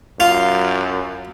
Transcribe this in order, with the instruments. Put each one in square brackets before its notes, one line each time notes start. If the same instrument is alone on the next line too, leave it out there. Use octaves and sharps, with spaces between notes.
[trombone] F#2 [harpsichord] F4